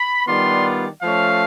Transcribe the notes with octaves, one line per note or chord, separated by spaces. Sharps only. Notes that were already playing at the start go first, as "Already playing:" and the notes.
Already playing: B5
D#3 G3 B3 D4 F4 C6
F3 A3 C#4 F5